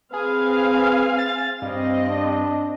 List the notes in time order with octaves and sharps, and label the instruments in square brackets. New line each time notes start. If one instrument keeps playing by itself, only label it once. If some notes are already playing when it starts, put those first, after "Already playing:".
[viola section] C4 F5 G#5 [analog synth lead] G#4 [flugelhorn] B4
[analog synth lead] A6
[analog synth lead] G2 [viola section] C4 D#5 [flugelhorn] F5
[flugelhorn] D4